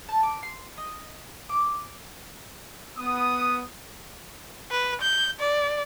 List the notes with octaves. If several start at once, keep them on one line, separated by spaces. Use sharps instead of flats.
A5
D6
C6
D#5
D6
B3 D#6
B4
G6
D5